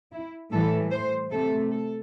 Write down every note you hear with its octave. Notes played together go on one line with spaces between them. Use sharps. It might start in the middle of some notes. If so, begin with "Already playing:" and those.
E4
A2 E3 G3 A4
C5
C3 A3 A4
A4